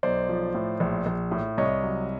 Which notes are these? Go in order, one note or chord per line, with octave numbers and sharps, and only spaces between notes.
B1 C5 D5
F3
A2
A#1
A#1
A2
C2 C#5 D#5
F#3